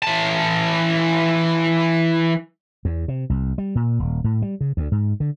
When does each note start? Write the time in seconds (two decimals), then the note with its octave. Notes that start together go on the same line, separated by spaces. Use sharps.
0.03 E3 A5
2.85 E2
3.08 C3
3.30 C2
3.58 G3
3.75 A#2
3.99 D#1
4.24 A2
4.42 G3
4.61 C#3
4.77 D2
4.92 G#2
5.20 D3